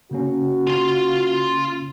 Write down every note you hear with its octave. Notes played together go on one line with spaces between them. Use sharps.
C#3 A#3 C#4 F#4
F4 C6